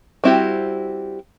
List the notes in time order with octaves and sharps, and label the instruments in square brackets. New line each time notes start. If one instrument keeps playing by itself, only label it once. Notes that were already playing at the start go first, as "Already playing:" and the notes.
[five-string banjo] G3 C4 E4 F#4 G4